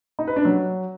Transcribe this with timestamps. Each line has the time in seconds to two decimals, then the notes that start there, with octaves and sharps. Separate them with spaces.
0.19 D#4
0.27 B4
0.36 D4
0.45 F#3